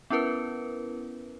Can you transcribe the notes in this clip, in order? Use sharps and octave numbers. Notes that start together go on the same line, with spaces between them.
B3 C#4 E4 A#4 B4